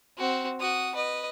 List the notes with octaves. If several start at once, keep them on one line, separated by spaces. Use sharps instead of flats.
C4 F#4
F#4 D#6
B4 D#5